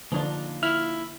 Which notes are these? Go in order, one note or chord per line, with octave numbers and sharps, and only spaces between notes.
D3 F3 A#3 D4 D#4 F4
E4 F6